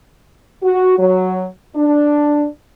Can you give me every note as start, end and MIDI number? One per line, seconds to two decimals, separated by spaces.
0.64 0.98 66
0.99 1.46 54
1.76 2.46 62